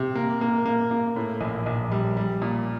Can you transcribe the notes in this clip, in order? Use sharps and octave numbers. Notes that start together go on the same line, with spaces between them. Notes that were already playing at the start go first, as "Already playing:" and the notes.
Already playing: C3
A#3
A#3
A#3
A#3
A2
A#1
A#1
G3
G3
A#2